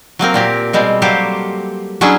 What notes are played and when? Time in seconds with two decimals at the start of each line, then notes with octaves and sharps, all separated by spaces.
0.19 F#3 A#3 C4 A#4
0.34 A#2 C4 G4
0.73 B2 G3 G#3 C4
1.02 F#3 G3 A#3 G4 A4 C5
2.01 F#3 C#4 D4 E4 G#4